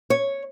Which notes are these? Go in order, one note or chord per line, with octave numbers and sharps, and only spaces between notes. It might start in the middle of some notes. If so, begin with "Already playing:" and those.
C#5